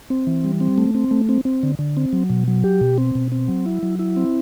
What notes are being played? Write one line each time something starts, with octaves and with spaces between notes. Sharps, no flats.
C4
E3
G3
C4
A3
C4
A3
C4
C4
D3
D3
C4
F#3
B2
F#3
G4
B2
C4
B2
C4
F#3
E4
F#3
E4
C4